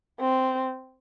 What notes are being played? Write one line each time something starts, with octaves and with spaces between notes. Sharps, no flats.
C4